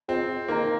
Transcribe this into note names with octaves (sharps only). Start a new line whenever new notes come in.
C4 F4 G#4 D#5
A#3 D#4 A#4 D#5 A#5